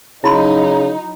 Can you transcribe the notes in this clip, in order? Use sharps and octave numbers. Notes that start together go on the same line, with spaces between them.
C#3 F#3 D#4 E4 B5 C6